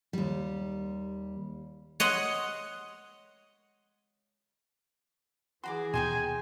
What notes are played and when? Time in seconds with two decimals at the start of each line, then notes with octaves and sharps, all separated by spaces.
0.13 D#2 G3
2.00 C#5 D#5 F#5 C6
5.64 E3 F#4 G#4 B5 C6 D6
5.94 D#2 B2 D#4 G5 G#5 C6 E7